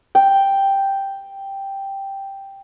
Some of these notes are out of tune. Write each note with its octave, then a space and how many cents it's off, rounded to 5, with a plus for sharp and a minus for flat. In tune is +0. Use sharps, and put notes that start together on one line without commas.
G5 +0